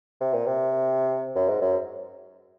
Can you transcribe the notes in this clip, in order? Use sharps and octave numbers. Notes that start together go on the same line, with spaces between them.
C3
A#2
C3
F#2
G#2
F#2